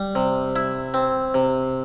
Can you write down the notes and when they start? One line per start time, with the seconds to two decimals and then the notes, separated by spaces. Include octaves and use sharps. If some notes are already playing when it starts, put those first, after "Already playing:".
Already playing: G3
0.15 C3
0.56 E4
0.94 C4
1.34 C3